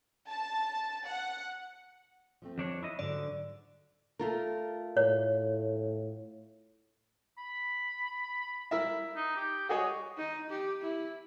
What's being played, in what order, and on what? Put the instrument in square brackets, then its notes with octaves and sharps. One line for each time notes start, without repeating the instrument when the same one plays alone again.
[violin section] A5
F#5
[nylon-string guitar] F3 A3 C4
[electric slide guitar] F2 D4 C#5
E4 D#5
[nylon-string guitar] G#2 F#3 [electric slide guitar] D3 [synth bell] D5
[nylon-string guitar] A3 F4 A#4
[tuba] A2 [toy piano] C#5
[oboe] B5
[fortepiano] E4 A#4 E5
[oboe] D#4
G4
[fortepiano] F#4 G#4 C#5 [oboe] D#5
[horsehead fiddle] D#4
G4
E4